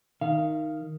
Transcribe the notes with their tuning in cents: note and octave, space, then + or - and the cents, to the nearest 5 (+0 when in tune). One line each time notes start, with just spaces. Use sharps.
D#3 +0 F5 -30